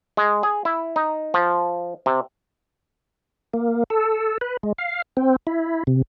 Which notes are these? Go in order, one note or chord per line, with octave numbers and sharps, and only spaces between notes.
G#3
G#4
E4
D#4
F3
C3
A#3
A4
B4
G#3
F5
C4
E4
C3